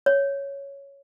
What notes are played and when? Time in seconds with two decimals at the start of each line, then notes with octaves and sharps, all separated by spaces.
0.06 C#5